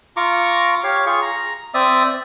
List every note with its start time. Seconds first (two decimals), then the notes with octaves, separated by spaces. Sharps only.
0.17 F4 A#5 C#6 D6
0.84 G4 C#5 F5
1.06 F4 G#4 C#6
1.22 A#5
1.74 C4 D5 E5 D#6